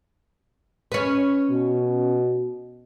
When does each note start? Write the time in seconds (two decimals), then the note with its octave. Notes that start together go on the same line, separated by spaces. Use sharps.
0.92 C#4 B4
1.50 B2